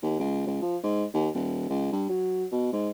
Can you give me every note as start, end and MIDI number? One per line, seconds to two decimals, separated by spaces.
0.02 0.15 39
0.20 0.45 37
0.47 0.61 37
0.62 0.77 53
0.83 1.05 44
1.14 1.29 39
1.34 1.65 27
1.70 1.88 37
1.92 2.07 43
2.09 2.45 54
2.52 2.71 47
2.72 2.90 44